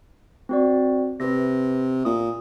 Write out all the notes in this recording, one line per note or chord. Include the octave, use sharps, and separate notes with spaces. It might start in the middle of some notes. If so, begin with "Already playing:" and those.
C4 F#4 D5
C3 B4 A#6
A#2 D#6